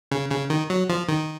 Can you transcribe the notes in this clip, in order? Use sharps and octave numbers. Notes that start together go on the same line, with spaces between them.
C#3
C#3
D#3
F#3
F3
D#3